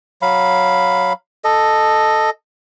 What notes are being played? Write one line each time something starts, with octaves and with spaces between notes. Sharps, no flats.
F#3 F5 B5
A4 D#5